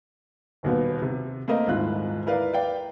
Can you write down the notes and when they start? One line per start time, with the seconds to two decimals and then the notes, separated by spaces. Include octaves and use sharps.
0.63 D#1 D#2 B2 B3
1.02 C3
1.48 A3 A#3 C4 A#4 D#5 F5
1.67 D#1 G#2 E4 F4 F#6
2.26 E4 A#4 B4 D5 F5
2.53 B4 D5 F5 G5